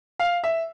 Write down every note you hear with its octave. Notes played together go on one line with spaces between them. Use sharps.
F5
E5